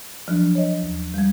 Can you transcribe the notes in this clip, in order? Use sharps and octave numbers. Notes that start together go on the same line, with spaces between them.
F3 F#3 D4
C#5 D#5
D#2
G3 G#3